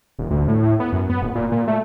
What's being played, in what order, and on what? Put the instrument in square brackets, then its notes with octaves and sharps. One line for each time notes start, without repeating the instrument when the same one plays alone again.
[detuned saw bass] D#1
D2
A2
A2
B3
F#2
B3
D#1
A#2
A#2
A3